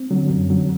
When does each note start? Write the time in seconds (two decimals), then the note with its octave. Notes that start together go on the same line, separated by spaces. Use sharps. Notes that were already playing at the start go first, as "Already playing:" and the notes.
Already playing: C4
0.11 D3 F#3
0.30 F#2
0.49 D3 F#3